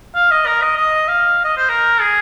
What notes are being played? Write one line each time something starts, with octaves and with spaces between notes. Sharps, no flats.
F5
D#5
A#4
D#5
D#5
F5
D#5
C5
A#4
G#4